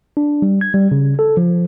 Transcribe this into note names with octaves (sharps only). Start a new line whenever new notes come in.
D4
G3
G#6
G3
C#3
A4
F3